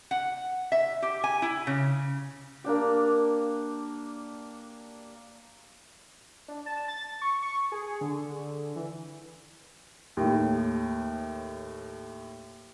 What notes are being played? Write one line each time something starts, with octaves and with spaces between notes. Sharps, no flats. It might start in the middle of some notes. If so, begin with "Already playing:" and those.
F#5
E5
G4
G#5
E4
C#3
A#3 D4 G4
D4
A5
A6
C#6
C#6
G#4
D3
E3
D#2 A2